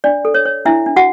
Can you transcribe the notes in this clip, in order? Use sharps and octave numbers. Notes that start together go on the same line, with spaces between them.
D4 D5
A4
C#5
C#5
D4 E4 E5
D4
F#4 F#5